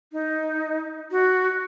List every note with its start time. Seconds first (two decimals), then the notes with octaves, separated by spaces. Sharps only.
0.13 D#4
1.11 F#4